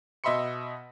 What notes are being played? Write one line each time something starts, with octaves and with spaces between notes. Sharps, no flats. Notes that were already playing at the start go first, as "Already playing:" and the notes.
B2 D#5 E5 B5 C6 C#7